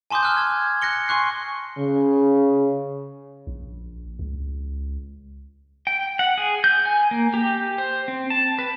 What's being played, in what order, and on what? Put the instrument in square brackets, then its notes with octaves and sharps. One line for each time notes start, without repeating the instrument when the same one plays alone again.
[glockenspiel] G#5 A5 C6 D6 D#6 G6
F6 F#6
F6 G#6
F#6 A#6 C#7 G7
G#5 C6 C#6 F#6 C7
[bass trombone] C#3
[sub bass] A#1
C#2
[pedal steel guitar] G5
F#5
G#4
G6
G#5
A#3
G4
C5
C4
A5
B4